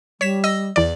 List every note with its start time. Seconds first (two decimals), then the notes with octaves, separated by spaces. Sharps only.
0.21 G3 C#5 B6 E7
0.44 D#5 E6 A#6
0.76 E2 D5